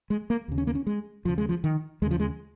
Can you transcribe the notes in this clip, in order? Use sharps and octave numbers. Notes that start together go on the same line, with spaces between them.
G#3
A#3
D#2 C#3
C#4
A#3
C#4
G#3
D#2 C#3 F3
G#3
F3
D#3
D#2 C#3 F3 G#3
G#3